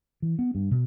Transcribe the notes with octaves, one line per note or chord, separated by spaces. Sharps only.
E3
B3
G2
B2